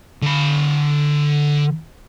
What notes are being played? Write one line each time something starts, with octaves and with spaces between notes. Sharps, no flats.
D3 B5